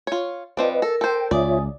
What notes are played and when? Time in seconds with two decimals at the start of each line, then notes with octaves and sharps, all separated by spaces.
0.07 F4 C#5
0.57 F3 C4 B4 D5 D#5
0.82 A4 A#4
1.01 A4 C5 G5
1.31 C#2 F4 C#5 D5 E5 G#5 D#6